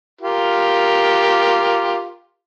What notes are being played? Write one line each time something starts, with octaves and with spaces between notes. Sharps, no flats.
F4 G4 A#4